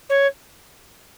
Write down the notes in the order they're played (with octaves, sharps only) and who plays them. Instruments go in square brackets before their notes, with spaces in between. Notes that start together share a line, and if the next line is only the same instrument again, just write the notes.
[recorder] C#5